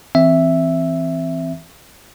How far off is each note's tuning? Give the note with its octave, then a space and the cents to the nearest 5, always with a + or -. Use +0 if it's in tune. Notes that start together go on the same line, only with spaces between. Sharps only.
E3 +0 C4 -5 E5 +0